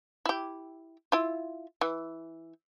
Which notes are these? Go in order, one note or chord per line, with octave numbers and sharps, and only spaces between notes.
E4 G4
E4 F4
E3